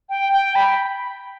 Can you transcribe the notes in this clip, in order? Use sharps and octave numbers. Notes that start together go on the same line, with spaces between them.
G5
G5
B5